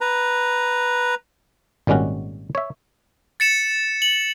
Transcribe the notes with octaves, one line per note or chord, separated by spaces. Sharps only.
B4 A#5
G#1 A#2 G3 G#3 C#4 F#4
C#5 E5
A6 C#7 E7
F#7